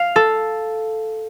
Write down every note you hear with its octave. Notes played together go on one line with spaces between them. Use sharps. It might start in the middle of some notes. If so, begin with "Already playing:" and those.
Already playing: F5
A4